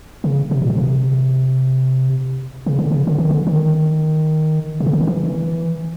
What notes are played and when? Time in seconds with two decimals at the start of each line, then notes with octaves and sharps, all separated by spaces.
0.24 C#3
0.51 C3
0.62 A#2
0.70 B2
0.78 C3
2.66 C#3
2.79 D3
2.91 C#3
3.07 D3
3.18 D#3
3.31 D3
3.47 D#3
4.80 C3
4.86 C#3
4.93 D3
5.00 D#3
5.08 E3